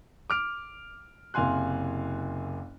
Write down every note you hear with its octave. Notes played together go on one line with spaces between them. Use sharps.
D6 F6 D7
F#1 C3 F5 G#5 C6 F#6